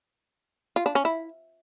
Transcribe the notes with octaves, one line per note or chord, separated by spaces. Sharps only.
F4
D4
C#4
E4